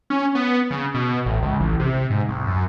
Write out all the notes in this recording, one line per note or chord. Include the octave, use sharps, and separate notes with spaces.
C#4
B3
C#3
B2
A1
C#2
A1
C3
G#2
C2
F#2